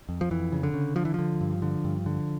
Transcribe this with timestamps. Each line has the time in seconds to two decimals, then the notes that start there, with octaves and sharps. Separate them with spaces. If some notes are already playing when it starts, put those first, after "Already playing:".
0.09 F2
0.21 F3
0.31 F2 E3
0.52 C#3
0.63 D3
0.74 C#3
0.96 D3 F3
1.05 E3
1.14 D3 F3
1.41 G2
1.62 D3
1.84 G2
2.06 D3